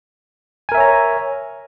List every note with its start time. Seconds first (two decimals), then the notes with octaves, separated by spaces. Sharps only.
0.69 G#5
0.72 A#4
0.75 E5
0.77 C#5
0.80 A#5